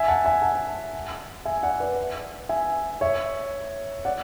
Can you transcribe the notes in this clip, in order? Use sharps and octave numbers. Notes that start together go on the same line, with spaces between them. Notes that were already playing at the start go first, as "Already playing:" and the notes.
Already playing: E5 G#5
F#5 A5
E5 G#5
F#5 A5
E5 G#5
D5 F#5
B4 D5
E5 G#5
C#5 E5
D5 F#5